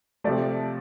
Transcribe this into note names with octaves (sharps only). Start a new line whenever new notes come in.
C3 F3 A3 D5